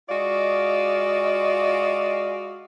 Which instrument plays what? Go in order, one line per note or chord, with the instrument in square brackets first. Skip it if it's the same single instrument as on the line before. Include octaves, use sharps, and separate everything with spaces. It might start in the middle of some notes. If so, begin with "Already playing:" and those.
[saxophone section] G#3 F4 F#4 D5 D#5 F5